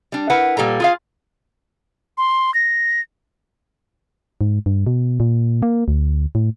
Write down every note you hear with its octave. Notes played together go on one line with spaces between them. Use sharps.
G3 D4
E4 A#4 B4 F#5
A#2 G3 A4 A#5
F4 G#4 F5
C6
A#6
G#2
G2
B2
A#2
A#3
D2
A2